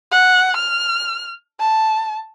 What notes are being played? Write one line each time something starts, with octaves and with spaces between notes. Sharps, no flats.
F#5
F6
A5